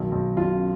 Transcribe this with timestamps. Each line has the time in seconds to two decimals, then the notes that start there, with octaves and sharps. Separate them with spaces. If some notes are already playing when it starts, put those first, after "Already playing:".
Already playing: B1 D#3
0.12 B1
0.37 B1 F4